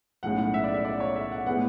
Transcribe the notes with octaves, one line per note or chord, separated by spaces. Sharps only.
B1 A2 G#3 C#4 F#5
F#5
E5
D5
E5
D5
C#5
E5
F#5
A2 G#3 B3 F#5